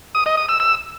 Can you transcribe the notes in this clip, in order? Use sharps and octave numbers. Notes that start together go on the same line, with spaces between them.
D#6
D#5
D#6
E6
E6